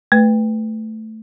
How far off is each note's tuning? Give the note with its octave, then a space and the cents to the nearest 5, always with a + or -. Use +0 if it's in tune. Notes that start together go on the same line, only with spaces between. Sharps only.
A3 +0 B4 +10